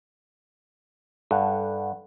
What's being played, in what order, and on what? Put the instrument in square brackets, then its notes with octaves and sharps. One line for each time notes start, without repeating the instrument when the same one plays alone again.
[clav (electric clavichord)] G2 [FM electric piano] A4 F#5